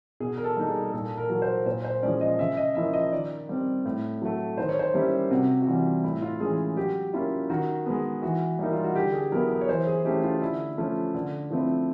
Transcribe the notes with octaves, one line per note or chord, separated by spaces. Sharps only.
B2 G#4
A#4
A4
G3 A#3 D#4
G#4
A#2 A4
A#4
F#3 A#3
C5
A#2 C5
C5
F3 G#3 C#4 D5
D#5
C#3 E5
D#5
F3 A#3 C#4 E4 E5
D#5
D#3 D5
G3 C4
A2
F#3 A3
D#3 C5
C#5
C5
G3 A#3 C#4 E4 G4
C3 F#4
F#4
E3 G3 F4
A2 E4
F4
E3 G#3 C#4 G#4
F#3 G4
A#3 C#4 E4 F4
D#3 F#4
G#3 B3
E3 F#4
G3 A#3 D#4 E4
F4
F#4
D3 G4
G#4
F#3 B3 E4 A#4
A#4
C#5
E3 C5
G#4
A3 C#4 E4 G4
F4
D3 E4
F3 A3 C#4 F4
D3
F3 A3 C4 E4